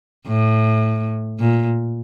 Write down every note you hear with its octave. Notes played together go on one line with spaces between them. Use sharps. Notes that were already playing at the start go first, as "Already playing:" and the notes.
A2
A#2